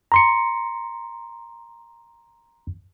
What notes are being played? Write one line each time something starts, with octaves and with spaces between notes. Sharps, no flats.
A#5 C6 C#7